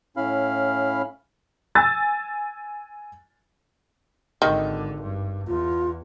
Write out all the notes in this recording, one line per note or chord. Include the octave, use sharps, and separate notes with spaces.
A2 C#4 E4 F5 B5 F6
G#5 E6 A6
G#1 D3 D#3
G2
E2 F4